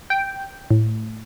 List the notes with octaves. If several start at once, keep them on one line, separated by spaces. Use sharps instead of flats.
G5
A2